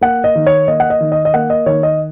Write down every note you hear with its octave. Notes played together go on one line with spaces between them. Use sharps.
A#3 F#5
D#5
D#3
C#5
A#3 D#5
F#5
D#5
D#3
D#5
D#5
A#3 F#5
D#5
D#3 C#5
D#5